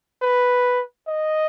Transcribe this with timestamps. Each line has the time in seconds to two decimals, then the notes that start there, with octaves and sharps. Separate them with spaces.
0.22 B4
1.08 D#5